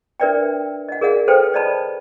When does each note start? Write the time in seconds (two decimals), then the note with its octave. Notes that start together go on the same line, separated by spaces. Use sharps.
0.20 D4 A#4 B4 D5 E5 G5
0.88 D#5 F#5
1.01 G#4 A#4 D5 F5 F#5
1.28 A4 B4 C5 F5 G5
1.54 D5 D#5 A5 B5